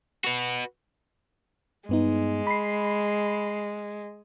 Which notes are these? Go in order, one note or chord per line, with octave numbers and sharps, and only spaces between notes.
F#4 B4
G2 G#3 B3 D#4
B5 C7